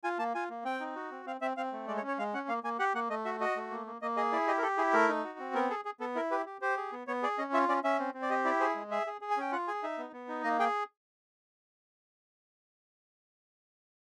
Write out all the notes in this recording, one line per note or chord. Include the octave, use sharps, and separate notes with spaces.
F4 G#5
A#3 A5
F4 G#5
A#3
C4 G5
D#4
F#4
C4
C4 F5
C4 E5
C4 F5
A3
G#3 D5
C#5
C#4
C#5
G#3 F5
C#4 F#5
A#3 F5
A#3 G#5
G4 F#5
A#3 F#5
A3 D#5
F#4 E5
F#4 D#5
A3
A#3
A#3
A#3 D#5
G#4 D#5
E4 D5
G4 D#5
A#4
G4 A4
E4 G#4
A3 A#4
D#4
F#4
C4
B3 A#4
G#4 A4
G#4
B3 A4
E4 A#4
G4 B4
G4
G4 C5
G#4
B3
B3 C#5
G#4 D5
C#4 D#5
F4 E5
C#4 D5
C#4 E5
C4
C4
D5
G4 D#5
E4 D5
G#4 C5
G#3
G#4 E5
G#4
G#4
G#5
C#4 G5
F4 F#5
G#4 G#5
D#4 E5
B3
B3
D#4
A#3 D#5
G#4 G5